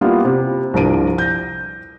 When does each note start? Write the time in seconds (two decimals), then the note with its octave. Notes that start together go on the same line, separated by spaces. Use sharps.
0.01 G3 A#3 B3 E4 F4
0.25 C3
0.74 C2 G2 F3 A#5 D7 D#7
1.18 G6 A#6